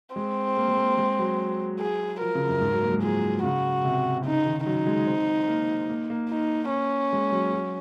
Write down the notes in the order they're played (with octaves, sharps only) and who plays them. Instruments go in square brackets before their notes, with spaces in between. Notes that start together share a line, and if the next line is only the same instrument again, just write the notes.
[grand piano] G#3 [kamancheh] C4
[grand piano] A#3
G#3
A#3
G#3
F#3
[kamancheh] G#4
[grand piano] F3 [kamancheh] A#4
[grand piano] C#3
F#2
G#2
F#3
A#3
F#3
G#3
[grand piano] F3 [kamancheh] G#4
[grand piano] C#3 [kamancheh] F#4
[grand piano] C3
[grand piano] C#3 [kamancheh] D#4
[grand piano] D#3
[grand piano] F#3 [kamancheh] D#4
[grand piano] G#3
C4
A#3
A#3
A#3
[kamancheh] D#4
C#4
[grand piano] G#3
F#3
F#3